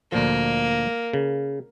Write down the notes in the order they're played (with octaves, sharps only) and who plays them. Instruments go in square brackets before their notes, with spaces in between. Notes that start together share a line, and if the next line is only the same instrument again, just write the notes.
[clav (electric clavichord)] D2 A#2 F3 [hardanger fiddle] A#3
[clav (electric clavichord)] C#3